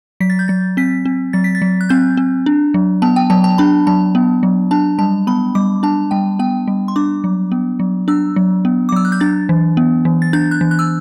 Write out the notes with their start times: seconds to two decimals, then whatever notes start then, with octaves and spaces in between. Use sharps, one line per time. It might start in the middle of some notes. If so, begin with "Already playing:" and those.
0.20 F#3 B6
0.30 A6
0.39 G6
0.48 F#3 A6
0.77 C4 B6
1.06 C4
1.33 F#3 A6
1.44 B6
1.55 A6
1.62 F#3
1.81 F#6
1.89 C4 G6
2.17 C4
2.46 D4
2.74 F#3
3.02 B3 A5
3.16 G5
3.30 F#3 A5
3.44 A5
3.58 D4 B5
3.87 F#3 A5
4.15 B3
4.43 F#3
4.71 D4 A5
4.99 G3 A5
5.27 B3 B5
5.55 G3 D6
5.83 D4 A5
6.11 G3 G5
6.39 B3 G5
6.68 G3
6.88 C6
6.96 D4 D6
7.24 F#3
7.52 B3
7.80 F#3
8.08 D4 E6
8.36 F#3
8.65 B3
8.89 D6
8.92 F#3 E6
9.05 F#6
9.12 G6
9.20 D4 A6
9.49 E3
9.77 B3
10.05 E3
10.22 A6
10.33 D4 G6
10.51 F#6
10.61 E3
10.71 F#6
10.79 E6